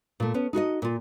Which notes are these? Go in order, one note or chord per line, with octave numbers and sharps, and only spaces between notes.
A#2 A3
B3 C#4
D#4 F#4 A4 D#5
A#2 F4